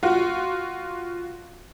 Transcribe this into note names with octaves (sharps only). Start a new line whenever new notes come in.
F4 F#4